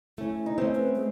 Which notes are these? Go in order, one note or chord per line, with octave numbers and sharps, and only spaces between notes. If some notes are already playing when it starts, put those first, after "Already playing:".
A3 C#4 E4
D#4
A3 C4 C#4
B4
G#3